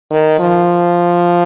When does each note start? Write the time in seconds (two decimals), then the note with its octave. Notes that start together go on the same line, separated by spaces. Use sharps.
0.11 D#3
0.39 F3